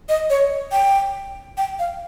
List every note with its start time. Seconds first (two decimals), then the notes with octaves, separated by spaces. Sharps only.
0.09 D#5
0.30 C#5
0.72 G5
1.57 G5
1.79 F5